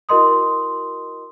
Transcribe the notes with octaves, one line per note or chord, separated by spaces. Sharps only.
E4 F#4 A#4 D#5 C6 D#6